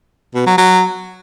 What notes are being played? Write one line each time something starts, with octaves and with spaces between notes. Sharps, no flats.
B2
F#3
F#3